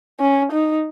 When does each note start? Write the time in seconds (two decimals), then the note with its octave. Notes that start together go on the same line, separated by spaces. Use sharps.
0.20 C#4
0.52 D#4